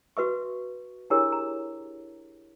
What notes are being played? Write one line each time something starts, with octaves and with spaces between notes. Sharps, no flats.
F#4 B4 E5 C#6
D4 E4 G4 G#4 A#4 C#5
A#5